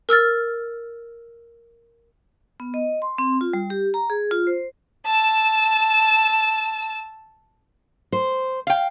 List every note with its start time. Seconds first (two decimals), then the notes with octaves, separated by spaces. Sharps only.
0.09 A#4 E6 F6 A6
2.60 B3
2.74 D#5
3.02 C6
3.18 C4
3.41 F4
3.53 G3
3.70 G4
3.94 A#5
4.10 G#4
4.31 F4
4.47 C5
5.06 A5 E6
8.12 C5
8.67 F5 G5